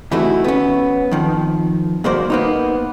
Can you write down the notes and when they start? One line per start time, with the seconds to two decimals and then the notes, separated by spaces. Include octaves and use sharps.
0.11 C3 E3 A3 D#4 E4 F#4
0.44 B3 C#4
1.11 F2 D#3 F3
2.04 A#2 G3 A#3 F#4 C5 D5
2.30 A#3 B3 D#4